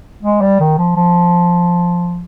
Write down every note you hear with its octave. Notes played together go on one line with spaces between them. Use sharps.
G#3
G3
D#3
F3
F3